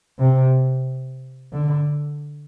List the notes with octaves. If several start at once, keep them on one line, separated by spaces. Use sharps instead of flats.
C3
D3